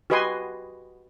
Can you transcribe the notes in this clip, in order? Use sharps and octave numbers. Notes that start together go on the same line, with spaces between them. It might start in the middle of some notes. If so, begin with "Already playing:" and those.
F#4 G4 B4 D#5 G#5 C6